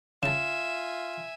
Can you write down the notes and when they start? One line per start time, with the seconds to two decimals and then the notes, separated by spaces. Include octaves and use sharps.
0.23 C#3 F4 E5 G#5 A5 E7